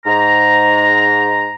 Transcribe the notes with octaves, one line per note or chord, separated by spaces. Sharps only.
G#2 A#5